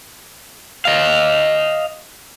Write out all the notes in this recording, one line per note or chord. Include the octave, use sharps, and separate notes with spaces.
D#5 F5